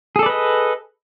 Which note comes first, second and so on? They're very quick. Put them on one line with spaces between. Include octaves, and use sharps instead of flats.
G#4 A4 D5 B4 D#5